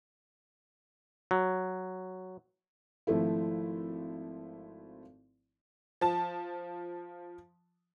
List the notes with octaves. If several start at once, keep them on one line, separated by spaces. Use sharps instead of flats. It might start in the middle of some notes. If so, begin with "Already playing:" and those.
F#3
G#1 F3 A3 E4
F3 A5